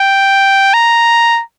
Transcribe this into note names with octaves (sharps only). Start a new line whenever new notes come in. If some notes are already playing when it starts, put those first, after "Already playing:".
Already playing: G5
A#5